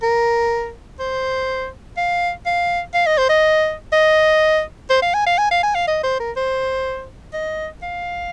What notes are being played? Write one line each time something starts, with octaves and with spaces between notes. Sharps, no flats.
A#4
C5
F5
F5
F5
D#5
C5
D#5
D#5
C5
F5
G#5
F5
G#5
F5
G#5
F5
D#5
C5
A#4
C5
D#5
F5